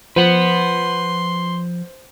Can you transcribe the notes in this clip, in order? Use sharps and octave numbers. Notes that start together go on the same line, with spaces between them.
F3 B4 C5 F#5 C6